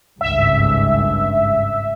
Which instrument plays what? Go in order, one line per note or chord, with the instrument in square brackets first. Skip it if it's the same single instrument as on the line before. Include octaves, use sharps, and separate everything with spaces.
[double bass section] G#1 C#2 G2 [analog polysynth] E5